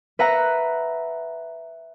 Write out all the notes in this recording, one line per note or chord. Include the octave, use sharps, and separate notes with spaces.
B4 E5 F#5 A#5